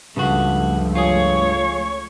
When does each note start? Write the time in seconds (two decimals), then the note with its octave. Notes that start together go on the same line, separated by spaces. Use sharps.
0.16 C#2 G2 C#3 F3 A3 F#4
0.95 F4 G#4 C#5 C#6